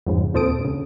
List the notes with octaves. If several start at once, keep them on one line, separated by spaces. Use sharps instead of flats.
F2 G#2 C#3
D#2 A#2 C4 A4 D#6 D7
D2 C#3